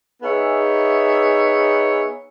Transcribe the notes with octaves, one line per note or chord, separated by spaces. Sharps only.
B3 D#4 G#4 C#5 E5